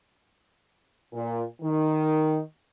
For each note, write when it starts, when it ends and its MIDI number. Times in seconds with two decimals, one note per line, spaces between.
1.13 1.42 46
1.61 2.38 51